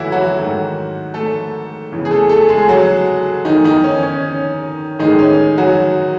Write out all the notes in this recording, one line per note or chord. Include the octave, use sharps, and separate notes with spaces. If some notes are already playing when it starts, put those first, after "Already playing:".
Already playing: E3 F#3 A3 E4 F#4
F#3 F#4
G#2 D#3 F#3 A3
A3 A4
E2 C#3 E3
G#4
A3 A4
A3 A4
G#3 G#4
F#3 F#4
E2 D#3 A3 D#4
D#3 D#4
C#4
C#4
C#4
A2 D#3 E3 G#3 D#4
C#4
F#3 F#4